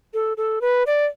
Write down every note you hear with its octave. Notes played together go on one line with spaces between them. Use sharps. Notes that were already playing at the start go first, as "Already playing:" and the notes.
A4
A4
B4
D5